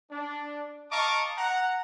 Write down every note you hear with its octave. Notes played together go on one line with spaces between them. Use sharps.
D4
D#5 F5 A5 A#5 C#6 D6
F#5 A#5